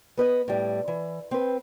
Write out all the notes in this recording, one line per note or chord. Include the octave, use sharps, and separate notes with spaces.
B3 B4 D#5
A2 G3
E3
C4 B4